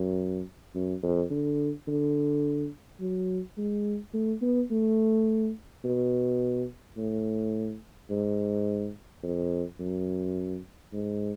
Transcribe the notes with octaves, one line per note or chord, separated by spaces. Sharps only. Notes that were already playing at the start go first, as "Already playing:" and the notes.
Already playing: F#2
F#2
F2
D3
D3
F#3
G#3
A3
B3
A3
B2
A2
G#2
F2
F#2
G#2